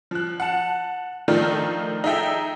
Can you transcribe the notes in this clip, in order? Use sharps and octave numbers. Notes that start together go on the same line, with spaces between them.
F3 F#6
F#5 A5
D#3 F3 A3 D4 D#4 F4
D#4 G#4 A4 E5 G5